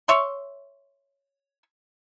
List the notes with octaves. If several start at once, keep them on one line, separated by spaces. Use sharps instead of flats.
C#5 E5 C6